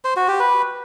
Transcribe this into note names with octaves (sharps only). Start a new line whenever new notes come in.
C5
F#4
G4
B4